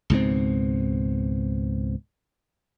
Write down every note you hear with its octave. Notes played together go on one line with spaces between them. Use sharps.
C#2 G#2 B2 C4